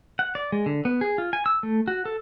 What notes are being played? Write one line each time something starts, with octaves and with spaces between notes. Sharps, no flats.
F#5
D5
G#3
D3
B3
G#4
F4
G#5
E6
A3
F#4
A4